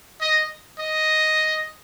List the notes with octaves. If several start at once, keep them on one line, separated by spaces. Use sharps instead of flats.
D#5
D#5